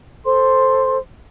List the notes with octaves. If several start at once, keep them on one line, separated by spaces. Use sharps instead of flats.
A4 C5 C6